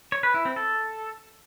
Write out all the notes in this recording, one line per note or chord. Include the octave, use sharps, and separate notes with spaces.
C#5
B4
E4
C4
A4